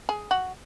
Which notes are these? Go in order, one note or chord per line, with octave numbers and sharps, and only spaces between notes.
G#4
F#4